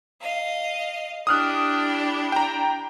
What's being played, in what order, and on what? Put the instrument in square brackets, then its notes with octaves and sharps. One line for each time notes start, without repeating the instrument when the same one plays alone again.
[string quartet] D#5 F5
[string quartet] D4 E4 G4 [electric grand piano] D#6 F6 F#6
[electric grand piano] G5 A#5